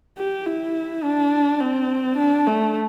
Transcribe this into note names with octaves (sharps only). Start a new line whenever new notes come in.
G4
E4
D4
C4
D4
A3